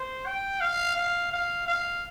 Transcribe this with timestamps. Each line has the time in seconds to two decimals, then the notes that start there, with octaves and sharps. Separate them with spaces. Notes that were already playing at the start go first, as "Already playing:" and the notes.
Already playing: C5
0.26 G5
0.61 F5
0.97 F5
1.32 F5
1.67 F5